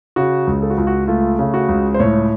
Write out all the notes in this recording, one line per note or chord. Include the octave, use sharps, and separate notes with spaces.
C#3 F#4
C#2
A4
F#4
C#2 F4
F#4
A3 F4
C#3
F#4
C#2
C5
A2 C#5